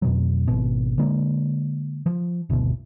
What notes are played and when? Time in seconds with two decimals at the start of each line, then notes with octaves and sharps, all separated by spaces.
0.02 F2 B2 F#3
0.48 G#1 B2
0.98 D3 G#3 A#3
2.06 F3
2.50 F#1 D2 B2